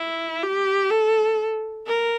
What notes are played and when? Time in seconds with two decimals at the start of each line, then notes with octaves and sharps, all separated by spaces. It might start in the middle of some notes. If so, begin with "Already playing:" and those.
Already playing: E4
0.43 G4
0.91 A4
1.87 A#4